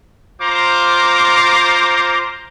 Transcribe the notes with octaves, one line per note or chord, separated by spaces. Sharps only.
F4 C5 A#5 C6 D6